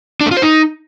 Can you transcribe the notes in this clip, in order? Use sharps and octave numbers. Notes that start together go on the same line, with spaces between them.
D4
A3
F4
C5
D#4